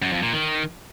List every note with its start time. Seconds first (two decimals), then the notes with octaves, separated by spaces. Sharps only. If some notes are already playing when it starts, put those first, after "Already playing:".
0.02 F#2
0.12 F2
0.23 A#2
0.33 D#3